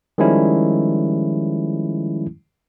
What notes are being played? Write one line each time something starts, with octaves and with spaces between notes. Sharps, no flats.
D#3 F3 G3 G#3 C#4 E4